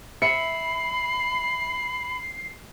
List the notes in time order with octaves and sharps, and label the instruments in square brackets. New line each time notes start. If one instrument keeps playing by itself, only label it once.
[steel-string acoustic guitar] E5 [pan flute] B5 [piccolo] C7 [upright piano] C#7